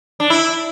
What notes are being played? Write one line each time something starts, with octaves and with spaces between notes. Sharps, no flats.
D4
E4